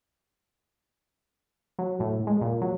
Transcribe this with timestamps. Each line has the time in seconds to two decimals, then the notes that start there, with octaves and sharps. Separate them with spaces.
1.79 F#3
2.00 A2
2.27 G#3
2.41 A#2
2.61 F#3